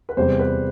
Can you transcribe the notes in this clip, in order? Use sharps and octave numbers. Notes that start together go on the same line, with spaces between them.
B4
E2 C3 G3 C5
B4